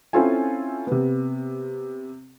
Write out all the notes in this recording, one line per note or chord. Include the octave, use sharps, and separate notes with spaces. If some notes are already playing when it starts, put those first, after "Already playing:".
C4 C#4 E4 F4 A4 G#5
C3 B3